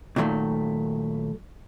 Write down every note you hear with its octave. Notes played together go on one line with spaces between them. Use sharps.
A#2 D#3 F#3 G3 A3